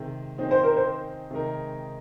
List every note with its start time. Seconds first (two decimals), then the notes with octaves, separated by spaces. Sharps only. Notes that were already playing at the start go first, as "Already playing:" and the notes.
Already playing: C3 D#3 G#3
0.38 D#3 C4 D#4 G#4
0.51 C5
0.63 A#4
0.76 C5
1.31 C3 D#3 G#3 D#4 A#4